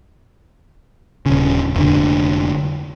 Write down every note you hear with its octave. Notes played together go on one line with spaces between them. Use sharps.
D#1 C#3
F1 D3